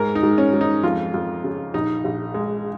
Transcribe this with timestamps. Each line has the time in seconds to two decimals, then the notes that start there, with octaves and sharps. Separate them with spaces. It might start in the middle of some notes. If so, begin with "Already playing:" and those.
Already playing: G#2 A#4
0.15 D#4
0.23 G#2
0.38 C#4
0.53 G#2
0.61 D#4
0.83 F2 F4
1.14 F2
1.44 C#3
1.74 A#1 D#4
2.04 A#1
2.34 G#3